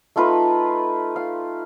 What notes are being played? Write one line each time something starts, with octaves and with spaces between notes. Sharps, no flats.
A3 D#4 F4 B4
F5